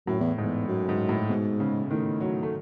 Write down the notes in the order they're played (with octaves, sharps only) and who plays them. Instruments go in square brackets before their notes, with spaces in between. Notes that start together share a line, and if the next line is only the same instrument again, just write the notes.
[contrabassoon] F#2 [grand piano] A2
[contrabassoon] E2
[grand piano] G#2
[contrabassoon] E2
F#2
[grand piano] G#2
A2
[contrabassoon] G#2 [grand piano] B2
[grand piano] C#3
[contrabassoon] A2 [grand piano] D#3
[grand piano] F#3
A3